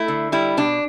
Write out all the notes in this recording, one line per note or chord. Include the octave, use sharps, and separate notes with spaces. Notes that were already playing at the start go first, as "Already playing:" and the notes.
Already playing: A3 E4
D3
G3 E4
B2 D4